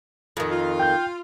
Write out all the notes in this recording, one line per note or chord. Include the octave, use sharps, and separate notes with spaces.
F2 D#3
F4
G5 G6